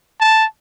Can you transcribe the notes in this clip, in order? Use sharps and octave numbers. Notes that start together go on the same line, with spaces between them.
A5